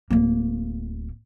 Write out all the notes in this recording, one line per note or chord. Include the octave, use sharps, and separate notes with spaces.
D1 A#3